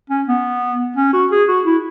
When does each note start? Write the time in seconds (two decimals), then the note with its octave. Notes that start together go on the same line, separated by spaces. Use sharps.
0.10 C#4
0.28 B3
0.97 C#4
1.13 F#4
1.31 G#4
1.48 F#4
1.66 E4